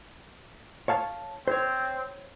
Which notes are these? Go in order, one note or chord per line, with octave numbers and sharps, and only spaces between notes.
C#5 F5 A5
C4 C5 C#5